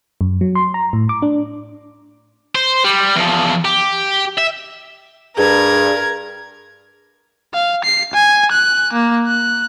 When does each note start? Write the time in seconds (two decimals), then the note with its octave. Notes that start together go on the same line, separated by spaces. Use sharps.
0.21 F#2
0.41 F#3
0.55 C6
0.74 A#5
0.93 A2
1.09 D6
1.22 D4
2.55 C5
2.85 G3
3.16 E2 F3
3.65 G4
4.38 E5
5.37 G2 G#4 A#4 G#6
7.54 F5
7.85 C7
8.14 G#5
8.52 F#6
8.93 A#3
9.27 F#6